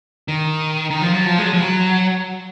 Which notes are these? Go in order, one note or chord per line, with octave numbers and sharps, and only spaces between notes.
D#3
D#3
F3
F#3
F3
G#3
F#3
F3
F#3